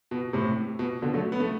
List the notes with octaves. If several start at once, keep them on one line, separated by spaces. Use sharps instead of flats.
B2
A2 C3
B2
B2 D3
F#3 A3
B3
A3